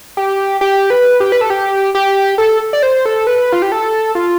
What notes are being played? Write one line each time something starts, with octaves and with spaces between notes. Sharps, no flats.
G4
G4
B4
G4
B4
A4
G4
G4
A4
D5
C5
A4
B4
F4
G4
A4
F4